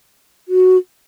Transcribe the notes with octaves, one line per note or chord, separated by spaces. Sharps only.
F#4